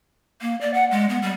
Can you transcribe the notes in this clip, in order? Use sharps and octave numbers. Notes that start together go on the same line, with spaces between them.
A#3
D5
F#5
G#3
B3
G3